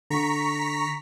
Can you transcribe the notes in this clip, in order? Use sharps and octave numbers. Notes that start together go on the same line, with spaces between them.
D3 A#5 C#6 B6